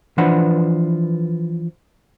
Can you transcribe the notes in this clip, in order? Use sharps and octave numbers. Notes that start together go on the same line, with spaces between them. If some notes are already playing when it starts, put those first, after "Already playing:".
E3 F3 D4 B4 F#5